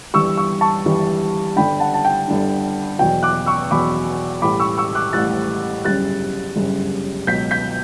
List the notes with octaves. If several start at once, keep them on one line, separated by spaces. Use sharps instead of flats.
G1 G2 E3 G3 C#6 E6
C#6 E6
A5 C#6
G1 G2 E3 G3
G1 G2 D3 G5 B5
F#5 A5
A5
G5
G1 G2 D3
E2 B2 F#3 G5
D6 F#6
C#6 E6
E2 B2 F#3 B5 D6
A1 A2 G3 B5 D6
C#6 E6
C#6 E6
D6 F#6
A1 A2 G3 F#6 A6
G1 F#2 C#3 G3 F#6 A6
G1 F#2 C#3 G3
C#2 B2 F#3 G6 B6
G6 B6